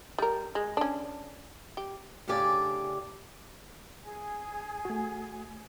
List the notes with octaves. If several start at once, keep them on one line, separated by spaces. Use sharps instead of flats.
G3 A#4
G#3
C#4 D4
G4
A2 C#3 D4 G4 D5 G#5
G#4 G#5
A3 F#4